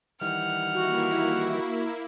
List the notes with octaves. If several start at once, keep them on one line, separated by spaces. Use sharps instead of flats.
D#3 E3 G3 F#5 F6
A#3 E4 F#4